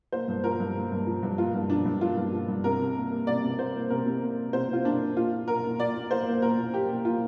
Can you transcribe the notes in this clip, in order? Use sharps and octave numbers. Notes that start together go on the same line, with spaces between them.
A#3 C5
G2
F3 A#4
G2
A#3
G2
F3
G2
A#3 F4
G2
F3 D4
G2
A#3 F4
G2
F3
G2
C3 A#4
C3
A#3
A#3
C3 D5
C3
A#3 C5
A#3
C3 A#4
C3
A#3
A#3
C3 C5
C3 F4
A#3 D4
A#3
A#2 F4
A#2
A#3 A#4
A#3
A#2 D5
A#2
A#3 C5
A#3
A#2 A#4
A#2
A#3 G4
A#3
A#2 F4